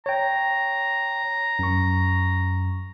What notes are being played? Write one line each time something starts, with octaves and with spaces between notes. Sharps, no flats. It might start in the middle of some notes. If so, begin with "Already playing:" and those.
C#5 G5 A#5
F#2 C#6